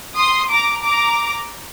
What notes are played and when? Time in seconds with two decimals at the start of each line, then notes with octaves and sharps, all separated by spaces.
0.16 C6 D#6
0.50 A#5 D6
0.84 A#5 D6